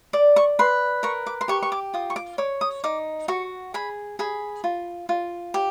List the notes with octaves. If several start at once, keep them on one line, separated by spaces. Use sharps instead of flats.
D5 D6
C#6
B4 C6
A#4 C#6
D6
C6
G4 C#6
C#6
D6
F4 D#6
C#6
D6
C#5 D6
D#6
D#4 D6
F#4 C#6
G#4 B5
G#4 B5
F4
F4
G4